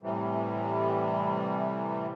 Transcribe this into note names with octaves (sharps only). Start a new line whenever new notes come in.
A2 C3 E3 G3